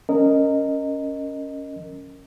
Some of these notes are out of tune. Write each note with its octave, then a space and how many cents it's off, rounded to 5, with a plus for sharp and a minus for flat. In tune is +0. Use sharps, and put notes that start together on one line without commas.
C#4 +0 A#4 -15 D#5 -5